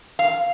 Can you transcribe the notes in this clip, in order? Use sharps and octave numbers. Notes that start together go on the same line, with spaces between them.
F5